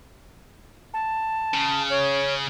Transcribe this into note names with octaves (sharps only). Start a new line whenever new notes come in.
A5
C#3
C#5